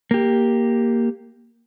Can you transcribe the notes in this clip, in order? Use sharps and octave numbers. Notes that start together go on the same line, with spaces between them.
A#3 G4